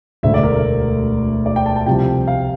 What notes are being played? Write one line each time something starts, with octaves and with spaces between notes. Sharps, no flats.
E1 D2 D3 A3 E5
D5
A#4
A#4
D5
G5
A5
A5
C2 C3 F3 G5
F5